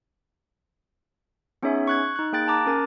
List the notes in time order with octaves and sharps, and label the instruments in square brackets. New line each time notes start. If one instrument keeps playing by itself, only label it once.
[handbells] B3 C#4 D#4 G#4 C#5 E5
C#6 F#6 G#6
D#4 F#6
A#3 G#4 G5 F#6 A6 D7
A5 A#5 D6 F#6 A6
C#4 A#4 A6